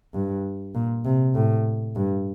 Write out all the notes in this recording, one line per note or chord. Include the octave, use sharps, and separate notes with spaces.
G2
A#2
C3
A2
G2